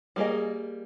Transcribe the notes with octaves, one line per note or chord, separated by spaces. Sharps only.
G3 A#3 D4 G#4 D#5